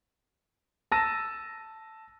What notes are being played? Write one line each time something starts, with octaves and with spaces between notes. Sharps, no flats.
A5 E6 A#6 D#7 E7